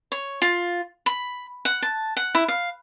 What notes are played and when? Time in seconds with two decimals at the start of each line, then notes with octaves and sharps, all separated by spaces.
0.12 C#5
0.42 F4
1.06 B5
1.65 F#5
1.82 A5
2.17 F#5
2.35 E4
2.48 F5